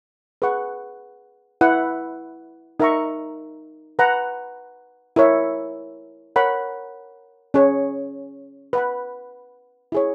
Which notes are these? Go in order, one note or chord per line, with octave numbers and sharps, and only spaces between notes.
G#4 B4 F#5 C#6
E4 B4 F#5
D#4 A#4 E5 A#5 C#6
B4 F#5 A#5
E4 A#4 C#5 E5
A#4 C#5 F#5 B5
C#4 G#4 C#5
B4 F#5 B5
E4 G#4 C#5